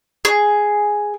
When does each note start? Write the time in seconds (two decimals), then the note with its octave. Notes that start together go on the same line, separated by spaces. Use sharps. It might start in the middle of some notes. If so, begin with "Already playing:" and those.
0.25 G#4